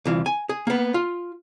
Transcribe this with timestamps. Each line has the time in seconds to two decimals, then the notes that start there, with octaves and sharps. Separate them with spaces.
0.05 C2 E3 F4
0.26 G#5
0.49 G#4
0.67 A#3 B3
0.94 F4